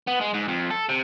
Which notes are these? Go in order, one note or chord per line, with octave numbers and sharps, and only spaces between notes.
B3
G#3
G#2
F2
A4
C3